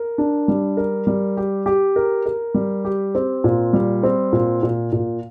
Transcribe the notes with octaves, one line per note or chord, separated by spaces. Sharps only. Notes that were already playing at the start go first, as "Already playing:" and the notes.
Already playing: A#4
D4
G3
A#4
G3
G4
G4
A#4
A#4
G3
G4
C4
A#2
G3
C4
A#2
A#2
A#2